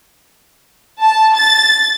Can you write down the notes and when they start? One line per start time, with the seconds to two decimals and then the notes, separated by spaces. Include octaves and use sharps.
1.01 A5
1.35 A6